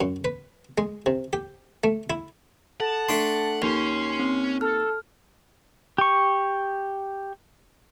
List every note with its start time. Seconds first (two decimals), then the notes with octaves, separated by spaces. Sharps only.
0.01 F#2
0.25 B4
0.78 G#3
1.06 C3
1.33 G4
1.84 A3
2.10 E4
2.80 A4 F#5 A5
3.09 A3 D4 C6
3.62 D#2 C#4 C6
4.20 C4
4.61 A4 F6
5.98 G4 C#6